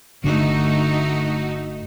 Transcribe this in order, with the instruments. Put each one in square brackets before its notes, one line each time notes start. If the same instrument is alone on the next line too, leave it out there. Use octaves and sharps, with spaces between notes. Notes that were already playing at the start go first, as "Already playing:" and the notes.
[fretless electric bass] G1 D3 [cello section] A3 D#4 F#4